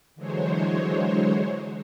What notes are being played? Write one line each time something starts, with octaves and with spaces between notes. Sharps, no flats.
D3 E3 F#3 G#3 C5 C#5